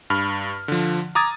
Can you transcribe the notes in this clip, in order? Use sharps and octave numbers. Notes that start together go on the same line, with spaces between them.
G2 B5 F6
D3 F3
A#5 D6 D#6 G#6 A6